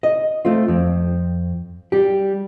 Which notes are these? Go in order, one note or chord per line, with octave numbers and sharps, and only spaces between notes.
D#5
A3 C4 F4
F2 C4
G3 G4